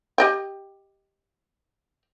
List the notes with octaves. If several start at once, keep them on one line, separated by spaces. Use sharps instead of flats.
G4 D#5 G5